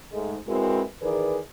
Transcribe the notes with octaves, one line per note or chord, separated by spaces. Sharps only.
G#2 G#3 A3
G#3 C4 E4 F#4 A#4 B4
D#3 E3 G#4 A#4 B4 D5